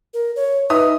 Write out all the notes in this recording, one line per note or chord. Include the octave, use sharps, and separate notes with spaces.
A#4
C#5
D#4 B4 E5 D#6